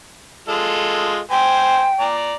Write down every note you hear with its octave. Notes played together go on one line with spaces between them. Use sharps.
G#3 F4 A4
C5 G5 G#5
D5 A#5